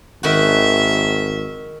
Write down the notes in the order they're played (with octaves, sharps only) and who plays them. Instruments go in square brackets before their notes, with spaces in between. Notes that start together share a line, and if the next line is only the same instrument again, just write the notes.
[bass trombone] G#1 [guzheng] D#3 F#4 [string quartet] E5